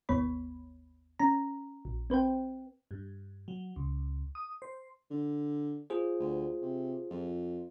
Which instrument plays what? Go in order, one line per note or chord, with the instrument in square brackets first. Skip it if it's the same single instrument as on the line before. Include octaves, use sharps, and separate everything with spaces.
[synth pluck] G#1 D#2 B3 C#5 B5
C#4 A#5
A#1
C4 B4 C5 G5
[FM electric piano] G2
F#3
C#2
D#6
C5
[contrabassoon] D3
[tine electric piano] F4 G#4 C5
[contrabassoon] D2
C3
F2